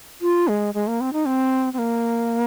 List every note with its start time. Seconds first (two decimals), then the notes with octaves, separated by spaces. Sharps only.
0.22 F4
0.48 G#3
0.74 G#3
0.87 A#3
1.01 C4
1.13 D#4
1.27 C4
1.73 C4
1.78 A#3